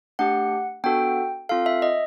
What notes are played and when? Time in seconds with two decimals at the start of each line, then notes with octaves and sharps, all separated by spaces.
0.19 A3 D4 G4 F#5
0.84 B3 D4 F#4 A4 G5
1.49 C4 F4 A4 F5
1.66 E5
1.82 D#5